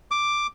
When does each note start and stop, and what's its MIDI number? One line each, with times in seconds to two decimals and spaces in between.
0.11 0.47 86